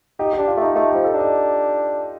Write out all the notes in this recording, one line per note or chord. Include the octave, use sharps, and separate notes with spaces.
D#4 G4
D4 G4
F4
A3
D#4
A3 D#4
F3 G4
A4
D4
D#5